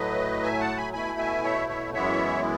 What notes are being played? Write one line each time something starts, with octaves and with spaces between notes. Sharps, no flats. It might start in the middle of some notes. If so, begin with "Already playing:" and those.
Already playing: A2 F#3 A3 B4 D#5
E5 G#5
F#5 A5
G#5 B5
B2 A3 E4 G#5 B5
E5 G#5
C#5 E5
C#5 E5
F#2 E3 G#3 B3 E4 C#5 E5